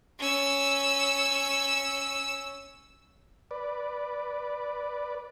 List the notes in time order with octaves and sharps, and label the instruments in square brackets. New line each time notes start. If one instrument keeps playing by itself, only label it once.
[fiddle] C#4 E6
[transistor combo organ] B4 D5